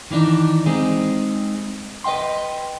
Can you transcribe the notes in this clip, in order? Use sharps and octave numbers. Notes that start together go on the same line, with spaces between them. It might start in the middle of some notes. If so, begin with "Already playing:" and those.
D#3 E3 G3 D4 D#4
G#3 C4 D#4 G#4
B4 D#5 F5 G5 C6